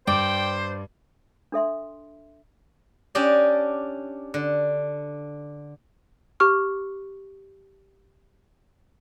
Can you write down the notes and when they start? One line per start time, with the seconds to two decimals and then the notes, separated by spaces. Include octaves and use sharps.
0.07 G2 C5 D5 G5
1.52 D4 A4 E5 C6
3.15 C#4 D4 G4 D5 D#5 A5
4.34 D3
6.40 G4 C#6 F6